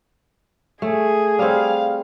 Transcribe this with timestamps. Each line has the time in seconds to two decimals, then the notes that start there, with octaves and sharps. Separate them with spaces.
0.82 A3 G#4
1.39 G3 C4 F5